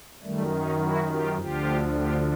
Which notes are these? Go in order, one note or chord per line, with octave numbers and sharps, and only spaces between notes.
F#2 D#3 G3 A3
C#4 D#4
E4 F#4
F4 G4
D2 D3 F3 F4 G4
F4 G4